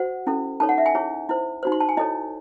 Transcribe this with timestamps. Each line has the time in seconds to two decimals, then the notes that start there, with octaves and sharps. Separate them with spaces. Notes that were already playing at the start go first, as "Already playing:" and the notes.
Already playing: F#4 C5 F#5
0.27 C#4 E4 A4
0.60 D#4 A4 C#5 A5
0.69 F#5
0.78 E5
0.86 G#5
0.95 E4 G#4 C#5
1.29 E4 C5
1.63 D#4 F#4 C5
1.72 C6
1.80 A5
1.89 G#5
1.97 E4 A4 C#5 D#5